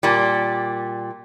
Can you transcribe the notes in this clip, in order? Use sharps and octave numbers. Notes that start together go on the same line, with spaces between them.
A#2 G3